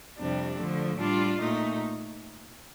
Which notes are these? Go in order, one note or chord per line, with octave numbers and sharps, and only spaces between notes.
F2 C3 G3 D4
D3 F3 A3
A2 G3 D4 F4
A#2 A3 D#4